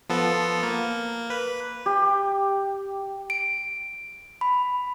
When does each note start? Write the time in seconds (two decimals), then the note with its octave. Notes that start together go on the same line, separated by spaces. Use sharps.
0.09 F3 B3 A4
0.63 A#3
1.30 B4
1.86 G4
3.30 D7
4.41 B5